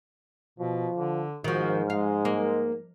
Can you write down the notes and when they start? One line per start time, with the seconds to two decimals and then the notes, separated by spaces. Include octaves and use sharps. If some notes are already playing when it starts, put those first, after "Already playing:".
0.59 B2 F3
0.95 D3
1.44 G#2 D#3 F3 F#4
1.90 G#3 F5
2.25 A#3